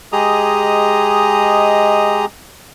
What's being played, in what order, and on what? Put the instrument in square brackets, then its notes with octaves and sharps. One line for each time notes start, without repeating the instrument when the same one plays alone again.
[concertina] G#3 G4 G#4 D#5 A#5 D#6